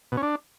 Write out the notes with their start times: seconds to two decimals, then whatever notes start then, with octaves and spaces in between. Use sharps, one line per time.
0.12 B2
0.17 C#4
0.23 D4